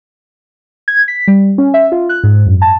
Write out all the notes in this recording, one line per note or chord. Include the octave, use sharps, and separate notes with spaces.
G#6
B6
G3
C#4
E5
F4
F#6
G#2
F#2
A5